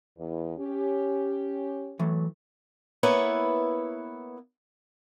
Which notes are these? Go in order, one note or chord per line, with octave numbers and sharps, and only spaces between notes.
E2
C#4 G4
E3 F#3 A3
A#3 B3 E4 B4 C#5 E5